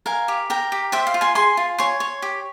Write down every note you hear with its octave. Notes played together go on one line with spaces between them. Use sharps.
A#4 F5 G#5
G4
A#4 G5 A#5
G4
C5 E5 G5
F5
F4
G#5 C6
G#4 G#5 C6
F4
C#5 G#5 C6
C#5
G4